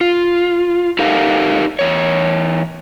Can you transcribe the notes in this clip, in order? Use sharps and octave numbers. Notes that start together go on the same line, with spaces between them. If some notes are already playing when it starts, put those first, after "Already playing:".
F4
D#4 G4 A4 A#4 F5 F#5
E2 C#5